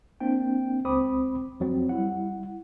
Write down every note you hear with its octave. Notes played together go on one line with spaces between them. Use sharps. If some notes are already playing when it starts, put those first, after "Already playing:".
A#3 C4 D4 G5
C#2 C4 C5 B5 D6 D#6
F2 F#3 C4
G3 E4 F#5